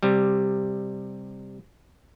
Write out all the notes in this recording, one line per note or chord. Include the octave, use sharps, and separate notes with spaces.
C3 G3